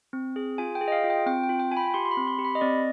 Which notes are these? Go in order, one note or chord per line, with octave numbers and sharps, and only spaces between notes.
C4
G#4
F4 G#5
G5
G#4
D#5
F5
F4
G5
C4 G5
G5
F4
G5
F4 G#5
B5
B5
G4 C6
C6
B5
C4
C6
G4
B5
D#5
C4 D5